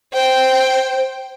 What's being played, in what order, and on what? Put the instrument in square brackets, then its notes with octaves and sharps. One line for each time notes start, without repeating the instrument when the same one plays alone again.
[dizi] C5 [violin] G5